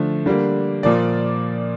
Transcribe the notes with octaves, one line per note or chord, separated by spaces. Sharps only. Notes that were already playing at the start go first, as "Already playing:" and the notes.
Already playing: D3 F3 A3
D3 G3 A#3
A#2 F3 A#3 D5